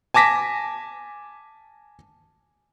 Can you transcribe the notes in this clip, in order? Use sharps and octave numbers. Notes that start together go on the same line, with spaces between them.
G#5 A5 D6 A#6 B6